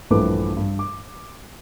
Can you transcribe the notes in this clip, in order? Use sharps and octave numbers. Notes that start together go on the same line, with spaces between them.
A#1 G2 E3 A3 B4 D6
G2
D6